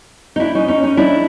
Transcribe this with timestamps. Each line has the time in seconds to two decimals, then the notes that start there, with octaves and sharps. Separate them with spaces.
0.36 D#4
0.40 D4 E4
0.55 C#4 D#4
0.68 C#4 D#4
0.83 C#4 D#4
0.97 D4 E4